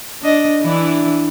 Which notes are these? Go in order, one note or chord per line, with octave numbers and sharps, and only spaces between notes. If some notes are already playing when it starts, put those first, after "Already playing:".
D4 D#5
E3 D4 E4